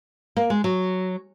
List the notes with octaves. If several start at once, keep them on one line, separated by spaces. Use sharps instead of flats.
A#3
G#3
F#3